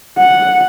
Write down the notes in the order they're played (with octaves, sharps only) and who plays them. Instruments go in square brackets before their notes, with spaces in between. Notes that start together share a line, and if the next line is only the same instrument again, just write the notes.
[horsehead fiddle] F#5